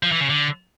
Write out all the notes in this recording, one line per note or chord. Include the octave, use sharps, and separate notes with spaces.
F3
E3
C#3
D3